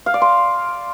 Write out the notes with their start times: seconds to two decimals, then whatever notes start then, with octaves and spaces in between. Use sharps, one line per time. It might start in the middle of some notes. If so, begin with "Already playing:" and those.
0.06 F5
0.14 D5
0.22 C6